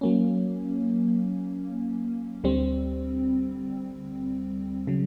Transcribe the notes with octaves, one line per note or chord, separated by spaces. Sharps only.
F#3 A#3 C#4
D2 D3 G3 C4
C#3 F#3